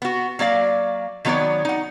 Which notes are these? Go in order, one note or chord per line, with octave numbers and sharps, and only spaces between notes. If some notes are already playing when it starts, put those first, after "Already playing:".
B3 F#4
F#3 A#3 D5 F5
D#3 F#3 B3 G#4 C#5 D5
D#4 F#5